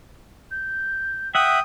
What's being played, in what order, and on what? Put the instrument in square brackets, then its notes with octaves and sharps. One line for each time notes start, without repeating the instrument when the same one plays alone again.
[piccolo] G6
[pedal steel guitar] E5 F#5 [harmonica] G5 D#6